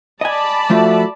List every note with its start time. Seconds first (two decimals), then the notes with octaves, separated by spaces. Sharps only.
0.21 D5 D#5 G#5 A5 B5
0.70 F3 A3 F4 F#4 A4 E5